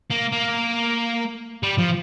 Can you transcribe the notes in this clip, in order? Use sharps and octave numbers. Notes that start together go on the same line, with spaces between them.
A#3
A#3
G3
F3